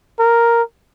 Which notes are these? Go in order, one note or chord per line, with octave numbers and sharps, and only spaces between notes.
A#4